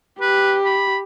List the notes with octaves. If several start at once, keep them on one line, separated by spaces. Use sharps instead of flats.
G4 B4
B5